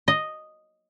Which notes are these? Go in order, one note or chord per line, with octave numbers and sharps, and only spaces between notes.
D#5